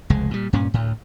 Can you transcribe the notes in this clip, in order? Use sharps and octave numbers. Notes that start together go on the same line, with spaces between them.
F1 C#2 G#3
A#2 G3
G2 A#2 C#4
D2 A2